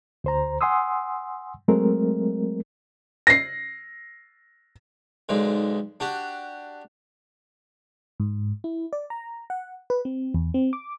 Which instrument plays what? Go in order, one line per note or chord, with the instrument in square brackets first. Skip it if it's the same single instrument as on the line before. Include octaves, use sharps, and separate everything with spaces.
[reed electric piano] D2 C5 A#5
F#5 G#5 C6 D#6 E6
F#3 G#3 A3 C4 A#4
[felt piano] A#6 C7
[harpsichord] B1 G#2 D3
D4 F#4 G4
[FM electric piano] G#2
E4
D5
A#5
F#5
B4
C4
E2
C4
D6